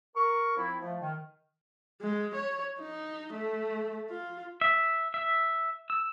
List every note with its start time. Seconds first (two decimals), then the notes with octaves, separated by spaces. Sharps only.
0.16 A#4 C#6
0.56 F3 C4 E4
0.81 F3 A3
1.01 D#3
2.01 G#3
2.35 C#5
2.80 D#4
3.33 A3
4.09 F4
4.61 E5
5.14 E5
5.90 E6